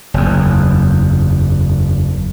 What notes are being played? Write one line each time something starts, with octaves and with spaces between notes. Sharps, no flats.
F#1 E2